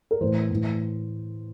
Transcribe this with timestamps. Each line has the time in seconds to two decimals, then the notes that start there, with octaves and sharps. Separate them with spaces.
0.11 A#4
0.21 A2 E3 C5
0.51 A2 E3